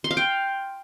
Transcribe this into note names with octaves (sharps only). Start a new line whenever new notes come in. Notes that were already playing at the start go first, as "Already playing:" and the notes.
C6
F5
G5